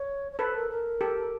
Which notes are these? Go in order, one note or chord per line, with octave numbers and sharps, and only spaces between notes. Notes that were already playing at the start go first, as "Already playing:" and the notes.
Already playing: C#5
C#5
A4 B4 C5
A#4
A#4
G4 A4